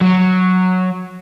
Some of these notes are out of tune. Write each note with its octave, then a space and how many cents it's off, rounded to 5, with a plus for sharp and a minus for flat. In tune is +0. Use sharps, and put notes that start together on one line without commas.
F#3 -5